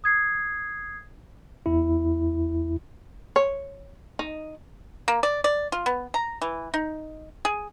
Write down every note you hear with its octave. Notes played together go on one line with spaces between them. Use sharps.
D#6 G#6 C7
E2 E4
C#5
D#4
A#3
D5
D5
F4
B3
A#5
E3
D#4
G#4